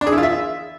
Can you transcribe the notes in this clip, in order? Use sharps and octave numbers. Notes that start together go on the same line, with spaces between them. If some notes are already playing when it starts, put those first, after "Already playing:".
D4
G#4
E4
F4
E5